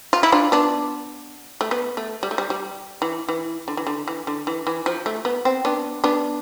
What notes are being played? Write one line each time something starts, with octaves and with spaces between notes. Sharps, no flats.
F4
E4
D4 F4
B3 D4
A3
B3
A3
G3
A3
G3
G3
E3
E3
D3
E3
D3
E3
D3
E3
E3
F3
A3
B3
C4
B3 D4
B3 D4